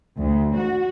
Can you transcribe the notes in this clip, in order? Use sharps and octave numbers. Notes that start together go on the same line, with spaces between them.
D2
F#4